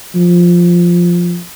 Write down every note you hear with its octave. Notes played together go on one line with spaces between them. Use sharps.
F3